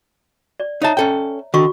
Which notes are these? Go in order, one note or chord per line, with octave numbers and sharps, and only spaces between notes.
D5
D#4 C#5 E5 A5 A#5
C#4 A4 G5
D3 D#3 F#4 C#6